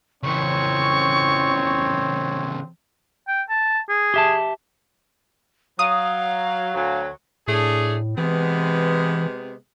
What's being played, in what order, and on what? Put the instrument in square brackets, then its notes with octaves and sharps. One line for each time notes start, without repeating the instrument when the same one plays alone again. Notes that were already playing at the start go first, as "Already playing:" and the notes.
[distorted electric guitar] C#3 E3 [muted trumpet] C4 [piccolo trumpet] C#5 [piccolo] C#6
[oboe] G5
A5
G#4
[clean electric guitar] G4 E5 A5
[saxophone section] F#3 [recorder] F5 [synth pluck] D#6
[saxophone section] D2 F#3
[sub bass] A2 [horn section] A3 D4 G#4
[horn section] C3 G#3 B3 [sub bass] E3